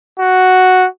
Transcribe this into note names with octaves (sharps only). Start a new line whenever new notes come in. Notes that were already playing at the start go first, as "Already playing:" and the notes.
F#4